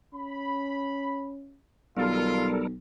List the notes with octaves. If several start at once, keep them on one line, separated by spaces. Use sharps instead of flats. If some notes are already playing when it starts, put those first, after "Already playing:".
C#4 B5
B1 D#3 G3 F4 A4 A#4